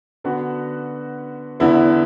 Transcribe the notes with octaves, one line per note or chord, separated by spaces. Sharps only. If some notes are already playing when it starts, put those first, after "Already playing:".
D3 B3 F#4
E2 D3 B3 E4